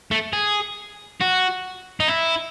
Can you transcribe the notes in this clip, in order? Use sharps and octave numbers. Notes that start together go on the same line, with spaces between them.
A3
G#4
F#4
D#4
E4